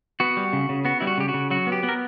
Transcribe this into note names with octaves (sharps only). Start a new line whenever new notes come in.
B3 F#4
G3
C#3
C#3
B3 F#4
G3 E4
F#4
C#3 G4
F#4
C#3
F#3 F#4
B3
G4
B3
A#4